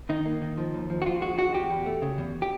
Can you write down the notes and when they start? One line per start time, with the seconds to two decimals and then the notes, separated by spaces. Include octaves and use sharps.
0.09 D#3 D#4
0.26 A#3
0.42 D#3
0.58 F3
0.73 D#2
0.90 F3
1.02 F#4
1.06 F3 F4
1.21 G#3 F#4
1.38 G#3 F#4
1.54 E2 G4
1.70 E2
1.86 A3
2.02 C#3
2.18 E2
2.42 G4